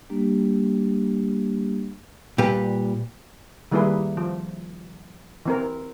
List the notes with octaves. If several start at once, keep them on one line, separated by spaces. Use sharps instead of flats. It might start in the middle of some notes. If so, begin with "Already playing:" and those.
G3 A#3 D4 G4
A#2 G3 G4 B4
D#3 G3 A#3 E4 G#4 B4
F3
E3 C4 A#4